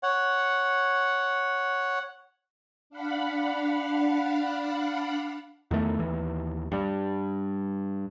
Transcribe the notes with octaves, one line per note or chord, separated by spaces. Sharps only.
C#5 F#5
D4 F5 F#5 B5
E2 D#3 A3
D#2 E3
G2 G3